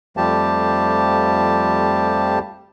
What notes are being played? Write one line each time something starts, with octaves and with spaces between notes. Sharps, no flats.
F2 F3 G3 A3 G4 A5